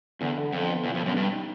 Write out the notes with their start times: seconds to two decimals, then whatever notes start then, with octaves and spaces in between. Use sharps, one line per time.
0.21 E2 D3
0.38 D3
0.53 F2 D3
0.68 B3
0.84 E2 B2
0.94 F2
1.00 B2
1.05 F#2
1.16 G2 G3
1.32 D#4